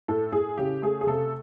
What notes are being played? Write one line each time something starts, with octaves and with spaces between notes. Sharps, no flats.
A2 A4
A2 G#4
C#3 G4
A3 G#4
G#4
C3 A4